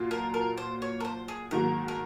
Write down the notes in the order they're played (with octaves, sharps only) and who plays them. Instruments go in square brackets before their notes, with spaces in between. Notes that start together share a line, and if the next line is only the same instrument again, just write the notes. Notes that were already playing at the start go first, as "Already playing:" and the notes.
Already playing: [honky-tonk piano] A#2 F#3 A#3 F4
[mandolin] A#4
A#4
C5
C#5
A#4
C5
G#4
[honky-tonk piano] G#2 D#3 F#3 A#3 [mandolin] A#4
[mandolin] A#4